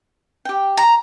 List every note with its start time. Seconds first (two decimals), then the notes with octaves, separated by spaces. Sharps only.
0.45 G4 G5
0.77 A#5